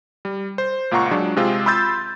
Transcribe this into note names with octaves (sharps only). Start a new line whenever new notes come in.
G3
C5
C#2 A#2 F4 F#5 A#5 C#6
F#3 G#3 D4
C3 G#3 C4 F4
B5 C6 E6 G6 A6